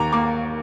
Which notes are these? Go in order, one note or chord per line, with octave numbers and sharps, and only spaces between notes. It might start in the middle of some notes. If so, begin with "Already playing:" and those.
Already playing: D#2 A#5 D6
A#3 A#5 D6